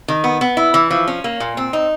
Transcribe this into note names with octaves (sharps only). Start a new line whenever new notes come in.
D#3
B3
B3
E4
E3
F3
C#4
A#3
A#2
C4
D#4